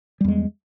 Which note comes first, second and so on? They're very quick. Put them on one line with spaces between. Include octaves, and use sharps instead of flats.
G3 E2 G#3